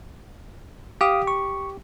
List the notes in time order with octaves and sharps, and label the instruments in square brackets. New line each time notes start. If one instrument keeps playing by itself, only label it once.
[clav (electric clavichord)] G4 [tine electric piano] F5 D6 D#6
[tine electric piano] C#6